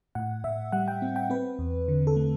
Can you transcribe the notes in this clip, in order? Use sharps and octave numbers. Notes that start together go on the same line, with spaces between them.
A2 F#5
A2 E5
G3 F#5
G5
C4
G5
C4 B4
E2
D3
A4
A3